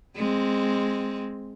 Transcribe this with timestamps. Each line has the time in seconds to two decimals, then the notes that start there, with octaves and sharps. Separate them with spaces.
0.16 G#3 C4